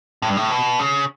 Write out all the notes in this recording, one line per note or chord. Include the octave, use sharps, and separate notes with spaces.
A2
G2
A2
B2
C#3